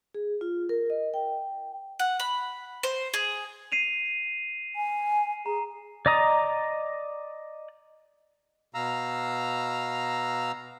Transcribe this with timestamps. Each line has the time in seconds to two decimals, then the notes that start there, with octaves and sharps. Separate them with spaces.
0.14 G#4
0.41 F4
0.69 A#4
0.90 D#5
1.14 G5
1.99 F#5
2.20 B5
2.83 C5
3.14 G#4
3.72 C7 D#7 F7
4.76 G#5
5.46 G#4 A#5
6.06 D5 D#5 A#5 D#6
8.74 B2 F5 A#5 E6